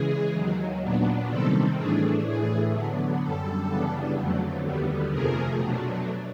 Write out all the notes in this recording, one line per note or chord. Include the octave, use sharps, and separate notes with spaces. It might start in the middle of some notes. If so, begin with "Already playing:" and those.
Already playing: C#3 E3 G#3 G#4
D#2 D#3 F#3
A#2 F#3 B3 D4
C3 D#3 G3 C4 A4
A2 E3 A3 D4 G#4
A2 E3 A3 G#4
D3 F#3 B3 D4
F#2 D3 G3 A4
C#3 E3 G3 B3 D4
F2 D3 F#3 A3
D#2 D3 G3 B3
F2 C3 F3 A3 G#4 A#4
B2 F#3 A3 D4